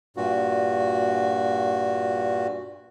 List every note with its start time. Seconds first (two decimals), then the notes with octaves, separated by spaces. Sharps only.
0.17 G2 A#2 F#4